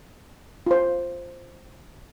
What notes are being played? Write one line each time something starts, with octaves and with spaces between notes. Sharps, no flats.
F4 C5